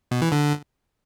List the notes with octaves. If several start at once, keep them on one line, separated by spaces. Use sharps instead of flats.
B2
E3
D3